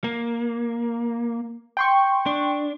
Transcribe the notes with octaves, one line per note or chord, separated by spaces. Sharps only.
A#3
G5 C6 C#6
D4